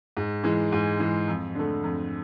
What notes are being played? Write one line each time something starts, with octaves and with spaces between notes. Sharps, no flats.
G#2
E3 G#3
G#2
E3 G#3
F2
D3 A3
F2